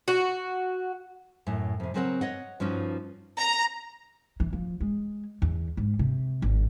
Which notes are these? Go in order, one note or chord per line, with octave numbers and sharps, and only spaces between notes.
F#4
F#2 A2
F2 C3
C#3 F#3 C4 A#4 D5 F#5
C#5 D#5 F#5
G2 F3 C#4 D#4 F#4
A#5
E3
F3
G#3
E2
G#2
C3
G#1